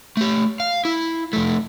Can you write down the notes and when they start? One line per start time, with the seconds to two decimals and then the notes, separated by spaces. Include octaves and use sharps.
0.17 A3 G4
0.60 F5
0.85 E4
1.33 F2 A3